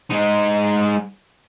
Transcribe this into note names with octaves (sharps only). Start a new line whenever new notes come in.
G#3 D#4